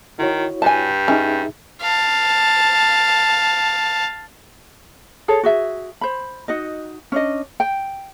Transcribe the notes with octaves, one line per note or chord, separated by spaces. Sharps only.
D#3 E4 F#4 C#5
G2 G#5 A5
C#4 D#4 G#4 E5
F5 A5
G#4 A4 C#5
F#4 G#4 E5
C5 B5
D#4 F#4 D#5
C#4 D4 D#5
G5